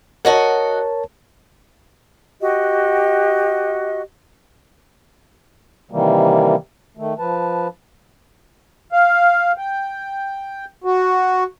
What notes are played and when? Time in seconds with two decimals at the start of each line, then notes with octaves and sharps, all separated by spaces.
0.25 F#4 A#4 C#5 D#5 F#5 A5
2.41 F#4 G4 D#5
5.91 C3 D#3 E3 G3 A#3
6.97 D#3 A3
7.19 F3 B4 A5
8.92 F5
9.58 G5
10.84 F#4